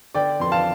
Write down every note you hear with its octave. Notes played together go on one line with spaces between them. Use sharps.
D3 D5 G5
F2 C6
F5 A5